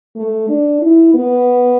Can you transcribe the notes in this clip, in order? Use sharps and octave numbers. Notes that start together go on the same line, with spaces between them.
A3
D4
E4
B3